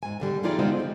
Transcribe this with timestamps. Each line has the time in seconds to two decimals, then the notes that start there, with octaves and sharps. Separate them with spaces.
0.03 G#2 G#5
0.20 G#2 D3 G3
0.43 E3 G3 D#4 F4 G#4 D5
0.59 B2 D3 G#3 C4 D#4 F4
0.80 C#3